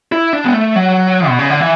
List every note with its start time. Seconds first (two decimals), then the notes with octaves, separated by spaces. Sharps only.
0.12 E4
0.33 D4
0.45 B3
0.54 A3
0.76 F#3
1.28 B2
1.39 C#3
1.50 D3
1.60 E3